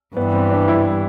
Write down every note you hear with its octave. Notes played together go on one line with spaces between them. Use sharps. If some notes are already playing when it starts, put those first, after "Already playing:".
G2 E3 G3 B3
C4
D4
E4